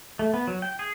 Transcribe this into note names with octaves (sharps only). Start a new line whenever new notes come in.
A3
B3
F#3
G5
G#4